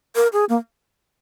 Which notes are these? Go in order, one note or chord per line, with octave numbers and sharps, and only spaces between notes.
A#4
G#4
A#3